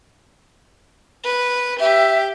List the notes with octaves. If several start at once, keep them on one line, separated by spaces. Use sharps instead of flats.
B4
G4 E5